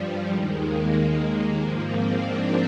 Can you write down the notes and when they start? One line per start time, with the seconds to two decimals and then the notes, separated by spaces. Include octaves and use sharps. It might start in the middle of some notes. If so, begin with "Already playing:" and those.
Already playing: G2 F3 G3
0.30 D#2 D#3 G#3
0.61 A#3
0.94 G#3
1.57 G#2 F3 A#3
1.88 C4
2.19 D4